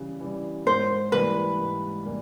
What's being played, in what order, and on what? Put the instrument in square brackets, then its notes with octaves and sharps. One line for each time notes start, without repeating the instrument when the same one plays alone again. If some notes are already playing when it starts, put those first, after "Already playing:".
Already playing: [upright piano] C#3 E3 G3
E3 G3
[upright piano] G#2 [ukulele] C5
[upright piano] E3 G3 A#3 [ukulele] B4
[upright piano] G#2
E3 G3 A#3